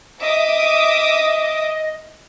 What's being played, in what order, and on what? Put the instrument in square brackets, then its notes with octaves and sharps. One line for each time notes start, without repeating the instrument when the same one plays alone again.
[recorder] D#5 [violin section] E5 D6 D#6